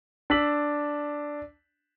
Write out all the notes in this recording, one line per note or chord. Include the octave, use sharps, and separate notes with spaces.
D4 E6 B6 F#7